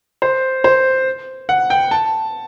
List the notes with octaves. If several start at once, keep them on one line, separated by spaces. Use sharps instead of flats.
C5
C5
F#5
G5
A5